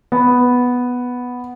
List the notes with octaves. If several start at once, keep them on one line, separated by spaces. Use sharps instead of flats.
B3